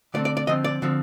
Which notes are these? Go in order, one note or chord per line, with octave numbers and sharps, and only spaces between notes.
D3 A3 C4 D5
D5
D5
D3 F3 C4 D#5
D5
D3 F3 C4